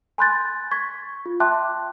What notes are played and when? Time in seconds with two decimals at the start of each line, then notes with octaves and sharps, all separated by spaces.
0.18 G#5 B5 C6 F#6 G6 A6
0.71 C#6 G#6 B6
1.26 F4
1.40 E5 G5 A5 C6 D6 F#6